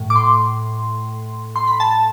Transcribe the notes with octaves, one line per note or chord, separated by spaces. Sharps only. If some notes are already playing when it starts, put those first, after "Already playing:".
Already playing: A2
D6
C6
C6
B5
A5